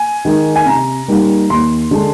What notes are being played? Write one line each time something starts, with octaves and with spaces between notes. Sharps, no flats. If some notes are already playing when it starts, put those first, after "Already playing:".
Already playing: G#5
D#3 G#3 D#4
G#5
C3 A#5
G3 A#3 D#4
D#2 C6
D3 G#3 D4